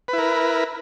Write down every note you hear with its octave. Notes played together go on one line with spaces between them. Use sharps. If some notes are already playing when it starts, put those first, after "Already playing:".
E4 A#4 B4